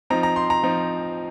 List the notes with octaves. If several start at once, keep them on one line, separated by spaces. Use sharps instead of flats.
F3 C4 D#4 A#5
A#5
C6
A#5
F3 C4 D#4